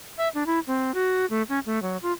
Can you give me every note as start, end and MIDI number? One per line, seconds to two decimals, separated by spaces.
0.18 0.28 76
0.34 0.43 62
0.47 0.59 64
0.67 0.94 60
0.94 1.26 66
1.30 1.42 57
1.49 1.59 61
1.66 1.81 57
1.82 1.97 54
2.03 2.12 65